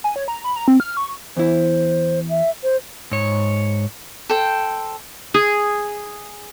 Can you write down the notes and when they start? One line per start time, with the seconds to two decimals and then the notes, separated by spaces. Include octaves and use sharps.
0.04 G#5
0.16 C#5
0.28 A#5
0.44 B5
0.56 A#5
0.68 C4
0.80 F6
0.97 C#6
1.37 E2 E4 C5
2.30 E5
2.63 C5
3.11 G#2 C#5
4.29 A4 C5 G5
5.34 G#4